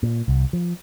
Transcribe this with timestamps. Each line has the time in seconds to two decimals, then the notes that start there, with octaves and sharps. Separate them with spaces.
0.03 A#2
0.28 C2
0.53 F3